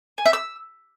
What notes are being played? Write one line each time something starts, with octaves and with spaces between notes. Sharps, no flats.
G#5
E5
E6